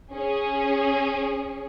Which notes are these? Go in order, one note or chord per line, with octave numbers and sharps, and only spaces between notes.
C#4 G#4